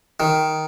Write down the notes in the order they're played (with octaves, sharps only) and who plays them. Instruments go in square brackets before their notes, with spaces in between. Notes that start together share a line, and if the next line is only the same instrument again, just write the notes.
[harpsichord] D#3